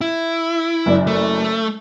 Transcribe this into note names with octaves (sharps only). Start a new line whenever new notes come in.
E4
F#1 F#2 D5
A3